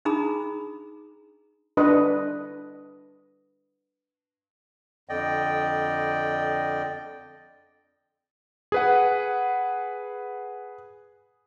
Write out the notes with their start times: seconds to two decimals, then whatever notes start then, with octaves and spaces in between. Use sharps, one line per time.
0.05 D4 D#4 G#4 A#5 B5 D#6
1.77 D4 B4 D#5
5.09 F2 D3 D5 D#5 G5
8.72 G#4 B4 F#5